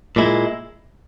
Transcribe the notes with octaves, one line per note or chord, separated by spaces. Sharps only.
A#2 G#3 E4